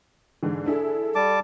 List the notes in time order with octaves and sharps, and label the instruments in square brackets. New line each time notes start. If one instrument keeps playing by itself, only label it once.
[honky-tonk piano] G#2 D3 E3
[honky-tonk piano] D4 E4 G#4 [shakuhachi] A4
[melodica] G3 A5 D6